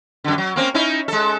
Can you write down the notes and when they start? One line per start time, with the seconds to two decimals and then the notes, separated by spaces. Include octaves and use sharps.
0.24 F#2 D3
0.38 F#3
0.56 A#3 C4 C#4
0.74 C#4 D#4 E4
1.08 G#3 A4